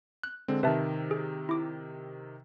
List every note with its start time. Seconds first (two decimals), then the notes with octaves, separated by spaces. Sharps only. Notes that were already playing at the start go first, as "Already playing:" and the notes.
0.23 F#6
0.48 D3 G#3 C4
0.63 C3 D#3 B4 E5 A5
1.11 G#4
1.49 E4 D6